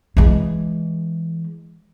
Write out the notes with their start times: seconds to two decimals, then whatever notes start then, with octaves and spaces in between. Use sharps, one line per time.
0.17 E3 G#3